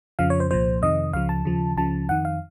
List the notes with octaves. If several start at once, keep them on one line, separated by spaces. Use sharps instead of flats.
F2 C#3 F3 F5
C#5
C5
C2 A#2 F3 C5
F2 C3 D#3 D#5
C#2 C#3 F3 F5
A5
D#2 C#3 F3
C#2 C#3 F3 A5
F2 D#3 F#5
F5